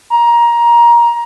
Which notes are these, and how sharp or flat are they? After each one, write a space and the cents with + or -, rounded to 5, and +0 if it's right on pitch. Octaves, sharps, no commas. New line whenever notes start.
A#5 +20